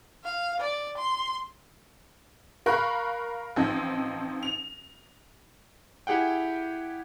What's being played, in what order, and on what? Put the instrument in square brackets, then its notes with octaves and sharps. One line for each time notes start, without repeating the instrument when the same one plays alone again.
[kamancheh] F5
D5
C6
[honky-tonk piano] A#4 F5 B5 C#6 F#6
A1 F3 C4 D#4
F7
[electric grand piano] E4 G4 G#4 F#5 G5